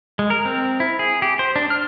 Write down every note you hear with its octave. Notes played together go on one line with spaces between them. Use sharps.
G#3
A#4
C4
E4
G#4
G4
C5
D4
F6